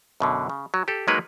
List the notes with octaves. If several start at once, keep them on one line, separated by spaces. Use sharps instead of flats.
F#2 B2 D3
C#3
F#3
G4 A4
F#3 G#3 A#3 D#4 A#4 B4